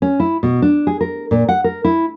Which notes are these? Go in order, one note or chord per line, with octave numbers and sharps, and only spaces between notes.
C#4
E4
B2
D4
G#4
A#4
A#2
F#5
A#4
E4